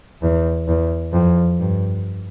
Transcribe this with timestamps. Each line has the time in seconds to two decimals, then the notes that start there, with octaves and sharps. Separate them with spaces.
0.22 E2
0.68 E2
1.13 F2
1.59 G2